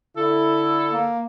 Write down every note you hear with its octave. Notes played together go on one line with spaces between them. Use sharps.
D3 E4 A4
A#3